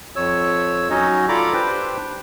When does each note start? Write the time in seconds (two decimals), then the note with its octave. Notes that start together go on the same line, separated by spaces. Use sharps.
0.16 F2 C#5 E6
0.90 F#3 C#4 D#4 F#4 C#5 D#5
1.29 F4 A4 D5 A#5 B5 D6
1.53 D4 G4 B4 C5 G5